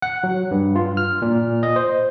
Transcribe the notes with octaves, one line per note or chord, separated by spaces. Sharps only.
F#5
F#3
G2
F4
F6
A#2
D#5
C5